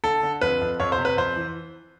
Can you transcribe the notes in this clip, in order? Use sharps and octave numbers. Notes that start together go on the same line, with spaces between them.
D3 A4
D3
F2 B4
F2
F2 C#5
C5
C3
B4
F2 C5
E3